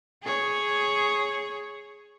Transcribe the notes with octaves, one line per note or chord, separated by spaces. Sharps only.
G#4 C#5